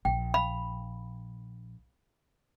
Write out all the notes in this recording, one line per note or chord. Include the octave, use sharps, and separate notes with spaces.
A#1 G5
F5 B5